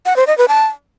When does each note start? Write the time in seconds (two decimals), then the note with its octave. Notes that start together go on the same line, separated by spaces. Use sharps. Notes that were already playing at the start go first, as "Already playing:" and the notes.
0.06 F#5
0.16 C5
0.27 D#5
0.38 B4
0.48 A5